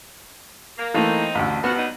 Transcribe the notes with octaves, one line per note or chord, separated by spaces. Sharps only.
A#3
E3 A3 A#3 C4 D#4
A1 D2
F3 B3 F#4
F#3 G3 D#4